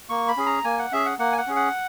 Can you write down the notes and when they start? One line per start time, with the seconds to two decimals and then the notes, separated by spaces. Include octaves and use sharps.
0.09 A#3 C#6
0.28 B5
0.37 C#4 G#4
0.46 A#5
0.64 A#3 G#5
0.78 F#5
0.92 C#4 G#4 E5
1.06 F#5
1.19 A#3 F#5
1.32 G#5
1.38 F#5
1.47 C#4 G#4
1.56 F#5